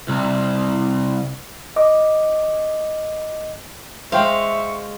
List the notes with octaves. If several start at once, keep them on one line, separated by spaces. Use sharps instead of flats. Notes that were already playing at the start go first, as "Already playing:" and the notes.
C2
D#5 D6
G#3 C5 E5 F5 G5 C#6